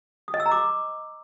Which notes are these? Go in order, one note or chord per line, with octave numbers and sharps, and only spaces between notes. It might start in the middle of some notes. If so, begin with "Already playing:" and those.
D#6
D#5
E6
A#5
D6